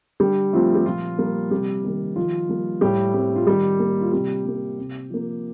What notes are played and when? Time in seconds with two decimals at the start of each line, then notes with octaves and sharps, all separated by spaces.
0.20 D3 G3 G4
0.53 F3 A3 C4 F4
0.75 G4
0.86 A#2 F3 F4
1.18 G3 A#3
1.51 C3 G3 G4
1.84 D#3 G3 A#3
2.16 D#3 F3 F4
2.49 G3 A#3
2.81 A2 G3 G4
3.14 G3 C4
3.36 F4
3.47 D#3 G3 G4
3.79 A#3
4.01 F4
4.12 C3 G3 G4
4.45 G3 A#3
4.78 C3
5.10 F3 A#3